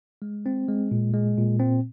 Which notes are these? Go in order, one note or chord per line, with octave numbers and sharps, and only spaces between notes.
G#3
C4
G#3
A#2
G#3
A#2
C4